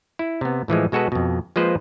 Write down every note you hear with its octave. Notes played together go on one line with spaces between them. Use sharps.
E4
C3 B3
A2 E3 F3 G#3
B2 G#3 F#4 A4 B4
F2 B2
F3 G#3 A#3 F4 B4 C5